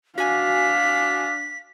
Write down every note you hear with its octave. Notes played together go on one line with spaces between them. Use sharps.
D4 F#4 F5 G#5 B6